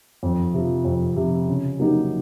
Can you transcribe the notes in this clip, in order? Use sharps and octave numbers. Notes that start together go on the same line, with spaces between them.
F2
C3 F3
F2
C3 F3
C#3
F#3 A#3 D#4 G4